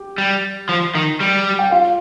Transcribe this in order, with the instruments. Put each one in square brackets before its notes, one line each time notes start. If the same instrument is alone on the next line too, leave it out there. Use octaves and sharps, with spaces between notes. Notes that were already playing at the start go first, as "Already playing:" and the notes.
Already playing: [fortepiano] G4
[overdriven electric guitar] G3
F3
D#3
G3
[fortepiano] G5
F4 F5